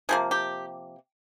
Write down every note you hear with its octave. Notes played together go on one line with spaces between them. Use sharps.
C3 F3 A#3 G#4
G4